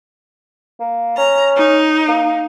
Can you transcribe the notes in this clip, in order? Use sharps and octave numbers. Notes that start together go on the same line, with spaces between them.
A#3
C#4 A#5
D#4
A#3